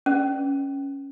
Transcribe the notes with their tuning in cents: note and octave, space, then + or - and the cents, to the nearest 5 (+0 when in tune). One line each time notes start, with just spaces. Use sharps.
C#4 +0 B4 +0